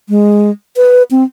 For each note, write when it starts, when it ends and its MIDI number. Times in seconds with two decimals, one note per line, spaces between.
0.09 0.50 56
0.77 1.03 71
1.11 1.24 60